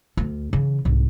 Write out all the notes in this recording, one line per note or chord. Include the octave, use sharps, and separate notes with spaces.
D2
C#3 E3
C2 G#2